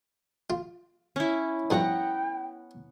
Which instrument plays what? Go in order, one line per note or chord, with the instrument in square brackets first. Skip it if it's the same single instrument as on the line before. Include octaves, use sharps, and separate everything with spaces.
[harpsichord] F4
[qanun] C#4 E4
[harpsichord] G2 F3 [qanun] B3 F#5 A#5 [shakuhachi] G5